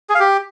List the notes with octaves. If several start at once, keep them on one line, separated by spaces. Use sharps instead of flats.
G#4
F5
G4